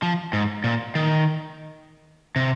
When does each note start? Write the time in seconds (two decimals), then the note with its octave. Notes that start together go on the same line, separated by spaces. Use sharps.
0.02 F3
0.33 G#2
0.64 A#2
0.95 D#3
2.36 C3